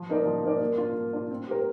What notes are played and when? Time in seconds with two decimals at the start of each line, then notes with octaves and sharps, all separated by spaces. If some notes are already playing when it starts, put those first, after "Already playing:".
Already playing: F3
0.09 A#3 D#4 A#4 D5
0.26 F3
0.43 A#3 D#4 A#4 D5
0.61 A#3
0.78 D4 F4
0.95 A#3
1.13 D4 F4
1.31 C4
1.48 G4 A#4